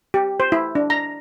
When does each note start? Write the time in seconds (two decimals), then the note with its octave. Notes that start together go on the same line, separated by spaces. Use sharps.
0.14 G4
0.40 C5
0.52 E4
0.75 D4
0.90 A#5